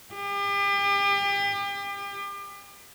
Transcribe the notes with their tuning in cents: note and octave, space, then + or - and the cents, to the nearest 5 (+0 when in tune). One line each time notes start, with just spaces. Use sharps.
G4 +35